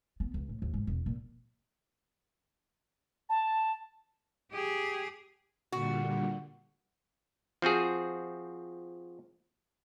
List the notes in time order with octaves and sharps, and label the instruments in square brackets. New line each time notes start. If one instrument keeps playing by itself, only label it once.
[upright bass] B3
C#2
A2
D#2
G#2
E1
A#2
[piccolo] A5
[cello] G4 G#4
[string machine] A#2 D3 G3 [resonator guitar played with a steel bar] F#4
[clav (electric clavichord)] F3 C4 F#4 G#4